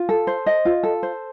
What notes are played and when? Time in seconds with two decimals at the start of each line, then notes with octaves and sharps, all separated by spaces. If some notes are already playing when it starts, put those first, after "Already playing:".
Already playing: F4
0.09 A4
0.27 C5
0.46 D#5
0.65 F4
0.83 A4
1.03 C5